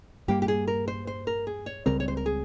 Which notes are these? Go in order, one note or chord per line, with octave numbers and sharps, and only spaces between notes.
G2 G3 A#3 G4
G4
G#4
A#4
C5
C5
A#4
G#4
C#5
C#2 C#3 G3 C4 A#4
C#5
C5
A#4
G#4